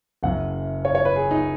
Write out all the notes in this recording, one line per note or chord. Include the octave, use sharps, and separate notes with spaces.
F#1 F#2 C#3 F#5
C#5
C#5
B4
G#4
D#4